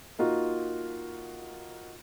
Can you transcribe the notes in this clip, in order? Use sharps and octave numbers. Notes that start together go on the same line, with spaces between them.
A#3 D#4 F4 F#4